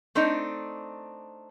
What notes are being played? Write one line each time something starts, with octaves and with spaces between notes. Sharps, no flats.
A3 C4 D4 D#4